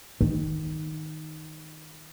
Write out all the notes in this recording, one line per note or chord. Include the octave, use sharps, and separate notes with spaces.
D#3